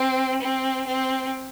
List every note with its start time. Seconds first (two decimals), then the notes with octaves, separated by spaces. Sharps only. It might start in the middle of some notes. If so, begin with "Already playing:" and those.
Already playing: C4
0.41 C4
0.86 C4